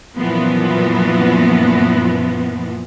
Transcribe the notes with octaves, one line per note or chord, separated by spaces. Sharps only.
F#2 A#2 E3 F3 B3